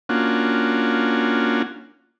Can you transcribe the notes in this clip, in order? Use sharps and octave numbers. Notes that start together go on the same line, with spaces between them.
A#3 C#4 D4 F4 F#4